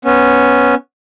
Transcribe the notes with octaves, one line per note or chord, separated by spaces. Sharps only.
B3 C#4